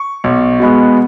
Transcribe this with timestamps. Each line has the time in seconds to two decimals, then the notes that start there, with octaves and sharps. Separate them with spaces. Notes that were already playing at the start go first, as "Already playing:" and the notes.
Already playing: C#6
0.24 B1
0.60 B2 G#3 B3